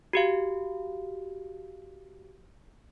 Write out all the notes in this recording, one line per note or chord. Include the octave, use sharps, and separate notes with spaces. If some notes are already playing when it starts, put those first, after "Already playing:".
F#4 G4 F5